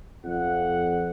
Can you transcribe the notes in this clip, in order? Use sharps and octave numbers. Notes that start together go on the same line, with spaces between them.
F2 F#5